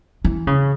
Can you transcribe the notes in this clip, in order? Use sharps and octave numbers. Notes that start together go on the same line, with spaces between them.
E3
C#3